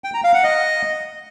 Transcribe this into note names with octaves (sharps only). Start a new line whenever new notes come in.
G5
A#5
F5
F#5
D#5